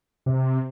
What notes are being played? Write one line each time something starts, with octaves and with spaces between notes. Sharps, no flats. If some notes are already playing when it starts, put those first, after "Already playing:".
C3